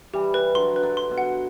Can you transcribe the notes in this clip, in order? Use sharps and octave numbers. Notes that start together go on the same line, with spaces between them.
E3 G3 G4
B4
D3 F#3 C6
B4
D3 F#3
C6
B2
F#5